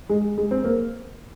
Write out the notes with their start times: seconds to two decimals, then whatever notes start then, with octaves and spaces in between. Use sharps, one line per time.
0.09 G#3
0.38 G#3
0.51 C4
0.64 A#3